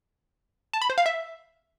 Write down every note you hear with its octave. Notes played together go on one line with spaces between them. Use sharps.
A5
B5
C5
F5
E5